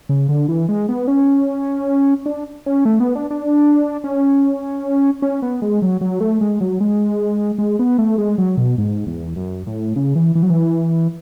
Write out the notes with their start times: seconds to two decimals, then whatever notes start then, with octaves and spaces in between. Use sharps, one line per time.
0.09 C#3
0.29 D3
0.48 E3
0.69 G#3
0.89 B3
1.07 C#4
2.26 D4
2.66 C#4
2.85 A3
3.00 B3
3.15 D4
3.30 D4
4.04 C#4
5.22 C#4
5.42 B3
5.62 G#3
5.82 F#3
6.01 F#3
6.20 A3
6.41 G#3
6.61 F#3
6.80 G#3
7.58 G#3
7.79 B3
7.98 A3
8.18 G#3
8.38 F#3
8.57 B2
8.78 G#2
9.07 E2
9.36 F#2
9.67 A2
9.96 C#3
10.15 E3
10.35 E3
10.43 F#3
10.50 E3